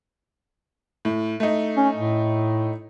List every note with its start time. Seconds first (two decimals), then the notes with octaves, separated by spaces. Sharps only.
1.05 A2
1.40 A3 D#4
1.77 C#4
1.96 A2